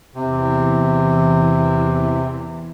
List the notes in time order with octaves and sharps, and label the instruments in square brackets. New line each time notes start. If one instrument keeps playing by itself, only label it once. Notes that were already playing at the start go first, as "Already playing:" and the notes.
[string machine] E2 E3 [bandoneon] C3